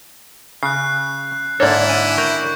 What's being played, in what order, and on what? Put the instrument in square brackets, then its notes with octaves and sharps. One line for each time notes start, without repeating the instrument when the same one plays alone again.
[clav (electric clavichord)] C#3 [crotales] F#6 C7
[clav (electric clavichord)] G#2 A#3 A4 [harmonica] D3 E4 [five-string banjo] C#5 D5
[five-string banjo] C#4 [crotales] D#7
[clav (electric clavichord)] A#4 G5 [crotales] C#6 G6